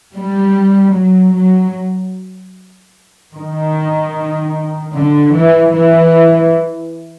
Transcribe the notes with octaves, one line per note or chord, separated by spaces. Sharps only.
G3
F#3
F#3
D#3
D3
E3
E3